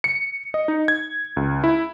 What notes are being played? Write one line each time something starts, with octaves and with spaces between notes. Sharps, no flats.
C#7
D#5
D#4
G#6
C#2
E4